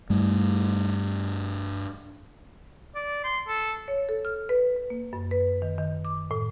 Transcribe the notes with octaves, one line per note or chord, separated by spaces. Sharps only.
G2 G3 A3
D5
C6
A4
C#5
A4
F6
B4
B4
A#3
F#2
B4
D#3
D#3
D6
A2